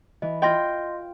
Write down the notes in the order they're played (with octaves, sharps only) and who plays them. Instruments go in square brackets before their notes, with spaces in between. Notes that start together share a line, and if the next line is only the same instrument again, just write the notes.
[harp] E3 [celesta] D#5
[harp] F4 G5 [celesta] D#5 C6 A#6